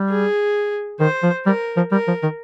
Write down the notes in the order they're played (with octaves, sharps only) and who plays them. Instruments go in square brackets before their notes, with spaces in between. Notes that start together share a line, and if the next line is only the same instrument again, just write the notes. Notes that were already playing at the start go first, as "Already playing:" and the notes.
Already playing: [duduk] G3
[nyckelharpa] G#4
[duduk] D#3 [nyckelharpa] C5
[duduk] F3
[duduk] G3 [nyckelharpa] A#4
[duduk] F3
[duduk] G3 [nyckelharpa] A#4
[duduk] F3
D#3